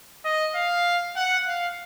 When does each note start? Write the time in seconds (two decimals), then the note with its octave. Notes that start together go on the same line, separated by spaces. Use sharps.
0.25 D#5
0.55 F5
1.16 F#5
1.46 F5